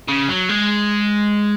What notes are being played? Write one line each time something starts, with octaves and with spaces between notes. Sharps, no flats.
C#3
F#3
G#3